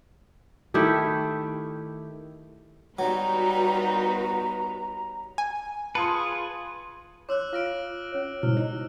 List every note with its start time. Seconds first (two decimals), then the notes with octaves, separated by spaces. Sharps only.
0.74 D#3 A3 E4 G4
2.99 F#3 G3 B3 D#4 F#4 B4 A#5
5.38 G#5
5.95 F4 G#4 B4 A5 C6 C#7
7.29 C#5 C6 D6 E6 F#6
7.53 F4 F5 F6 A#6 D7
8.12 C#4 C#5
8.43 G#2 B2 E4 C5 F6
8.57 D#4